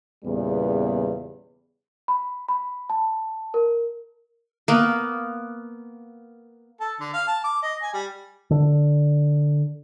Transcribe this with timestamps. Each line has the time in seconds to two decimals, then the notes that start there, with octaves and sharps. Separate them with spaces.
0.24 E2 A#2 C#3 G3 B3
2.08 B5
2.49 B5
2.90 A5
3.54 A#4
4.68 A#3 B3
6.80 A4
7.00 D3
7.13 F5
7.28 A5
7.44 D6
7.63 D#5
7.82 G#5
7.94 G3
8.51 D3